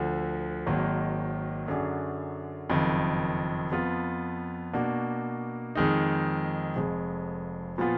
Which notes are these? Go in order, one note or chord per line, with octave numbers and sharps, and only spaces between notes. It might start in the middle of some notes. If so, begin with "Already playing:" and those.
Already playing: D2 D3 F3
G#1 G#2 D#3 F#3 A#3
F#2 D3 F#3 D4 G#4
F#1 F2 D#3
F2 F3 B3 F4
B2 A#3 D4 F#4
F2 D#3 G#3 D#4
F1 F2 F3 G#3
A#2 F3 B3 F4